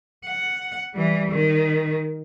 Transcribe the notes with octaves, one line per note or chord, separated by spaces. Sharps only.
F#5
E3 G3
D#3